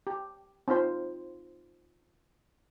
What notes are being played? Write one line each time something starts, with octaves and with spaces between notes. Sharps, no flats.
G4
C4 D#4 F4 C5